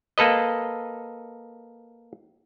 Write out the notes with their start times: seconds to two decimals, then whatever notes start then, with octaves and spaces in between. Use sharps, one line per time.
0.18 A#3 A4 B4 D#5